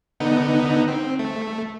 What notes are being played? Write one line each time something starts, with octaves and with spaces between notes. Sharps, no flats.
D3 B3 D#4
C4
A3